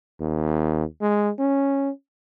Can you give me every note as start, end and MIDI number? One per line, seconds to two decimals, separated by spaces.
0.20 0.84 39
1.01 1.30 56
1.39 1.90 61